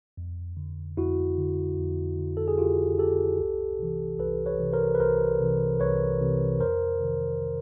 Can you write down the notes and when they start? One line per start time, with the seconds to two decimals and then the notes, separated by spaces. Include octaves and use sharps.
0.18 F2
0.57 D3
0.97 F2 E4 F#4
1.38 D3
1.77 F2
2.18 D3
2.37 A4
2.48 G#4
2.58 F2 F4 G4
2.98 D3 G4 A4
3.39 C2
3.79 C3 E3
4.19 C2 A4 B4
4.46 B4 C#5
4.60 C3 E3
4.73 A#4 C5
4.95 B4
5.00 C2 A#4 C5
5.41 C3 E3
5.80 C2 B4 C#5
6.20 C3 E3
6.60 F2 A#4 C5
7.01 C3 D#3